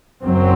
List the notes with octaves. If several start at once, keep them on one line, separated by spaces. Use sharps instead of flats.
F#1 F#2 F#3 C4